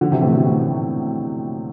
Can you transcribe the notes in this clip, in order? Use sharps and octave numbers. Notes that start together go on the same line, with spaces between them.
D3 F3
C3 E3
A2 C3
B2 D3
A2 C3